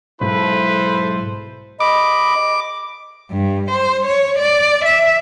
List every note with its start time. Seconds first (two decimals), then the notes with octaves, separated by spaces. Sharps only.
0.21 B1 G#2 E4 A4 B4 C5
1.80 D#5 B5 D6
3.31 G2
3.71 C5
4.06 C#5
4.39 D5
4.85 E5